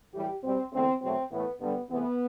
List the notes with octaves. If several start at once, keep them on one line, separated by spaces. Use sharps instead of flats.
A2 E3 G3 G4
B2 G3 C4
E2 D3 A3 C4
E2 B2 F#3 A3 C4
A2 E3 A3 B3
G2 D3 G3 B3
E2 C3 E3 A3 B3